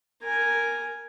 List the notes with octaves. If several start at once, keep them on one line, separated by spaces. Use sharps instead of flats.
A#4 G#5